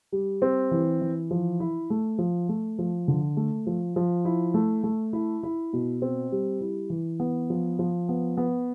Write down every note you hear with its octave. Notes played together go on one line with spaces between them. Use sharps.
G3
C4
E3
E3
F3
E4
A3
F3
A3
F3
D3
A3
F3
F3
E4
A3
A3
E4
E4
B2
C4
G3
E4
E3
B3
F3
F3
B3
B3